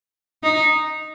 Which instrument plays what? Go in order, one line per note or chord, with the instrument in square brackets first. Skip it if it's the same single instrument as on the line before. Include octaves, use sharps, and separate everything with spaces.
[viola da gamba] D#4